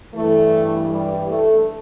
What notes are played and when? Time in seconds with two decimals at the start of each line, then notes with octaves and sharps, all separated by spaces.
0.14 G2 E3 A3
0.91 G3
1.30 A3